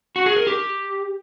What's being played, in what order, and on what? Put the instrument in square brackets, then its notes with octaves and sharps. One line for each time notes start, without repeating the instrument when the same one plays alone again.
[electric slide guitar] F#4
G#4
A#4
G4